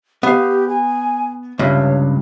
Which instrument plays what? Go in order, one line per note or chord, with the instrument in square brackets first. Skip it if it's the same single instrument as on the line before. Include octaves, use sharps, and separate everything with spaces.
[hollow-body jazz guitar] B3 F5 [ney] G4
[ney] G#5
[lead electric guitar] C#2 [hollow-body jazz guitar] G2 C3 [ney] C#5